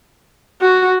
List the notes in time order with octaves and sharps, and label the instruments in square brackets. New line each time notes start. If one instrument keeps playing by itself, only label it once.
[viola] F#4